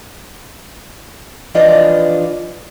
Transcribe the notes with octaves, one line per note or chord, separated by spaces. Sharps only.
E3 F3 D4 F4 D5 D#5